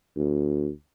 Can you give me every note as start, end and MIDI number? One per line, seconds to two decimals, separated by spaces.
0.16 0.70 38